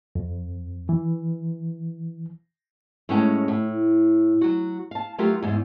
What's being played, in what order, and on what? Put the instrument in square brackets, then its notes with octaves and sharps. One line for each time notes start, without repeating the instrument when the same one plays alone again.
[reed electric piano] F2
E3
[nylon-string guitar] A2 G#3 C#4 F#5 G5 A5
A2
F#3 F#4
F5 A5
F#3 A3 F4 G4 A#4
E2 G#2